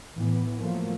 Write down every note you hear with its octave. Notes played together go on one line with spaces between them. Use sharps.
A2 E3 B3
F3 F#3 A3 A#3